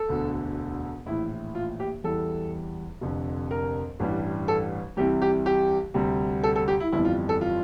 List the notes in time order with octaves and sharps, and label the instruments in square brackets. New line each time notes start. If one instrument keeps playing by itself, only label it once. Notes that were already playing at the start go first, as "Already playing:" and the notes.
Already playing: [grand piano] A4
E1 D2 D3
A#1 A2 E3 E4
F4
G4
E2 E3 G3 A4
F1 F2 D3
A#4
A1 G2 E3 G3
A4
C2 C3 E3 G3 G4
G4
G4
D2 C3 G3
A4
A4
G4
E4
G1 F2 E3 G3 E4
F4
A4
F4